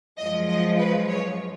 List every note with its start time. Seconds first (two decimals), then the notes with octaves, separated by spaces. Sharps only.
0.18 F#2 F3 G#3 D#5
0.48 D#5
0.79 B4
1.09 C#5